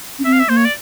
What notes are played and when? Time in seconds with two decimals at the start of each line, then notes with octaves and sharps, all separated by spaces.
0.19 C#4
0.25 C4 E5
0.33 F5
0.40 E5
0.49 A#3 C5
0.57 C#5
0.65 D5